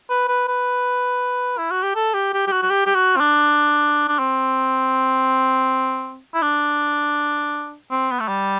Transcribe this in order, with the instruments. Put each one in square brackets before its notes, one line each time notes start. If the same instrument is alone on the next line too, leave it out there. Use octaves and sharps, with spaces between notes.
[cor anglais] B4
B4
B4
E4
F#4
G4
A4
G4
G4
G4
F#4
F#4
G4
G4
F#4
C4
D4
D4
C4
E4
D4
C4
B3
A3
G3